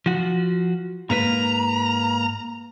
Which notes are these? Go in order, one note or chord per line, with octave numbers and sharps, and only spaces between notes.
F3 F#4
G#2 A#3 B4 A#5